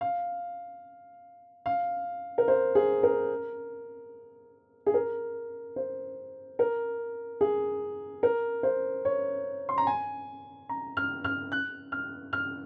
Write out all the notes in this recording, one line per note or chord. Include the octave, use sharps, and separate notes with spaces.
F5
F5
A#4
C5
G#4
A#4
G#4
A#4
C5
A#4
G#4
A#4
C5
C#5
C6
A#5
G#5
A#5
F6
F6
F#6
F6
F6